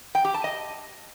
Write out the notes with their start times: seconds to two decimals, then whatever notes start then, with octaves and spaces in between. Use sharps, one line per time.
0.15 G5
0.25 G4
0.34 A5
0.44 D#5